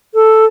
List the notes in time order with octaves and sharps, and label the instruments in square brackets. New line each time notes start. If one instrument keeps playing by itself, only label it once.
[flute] A4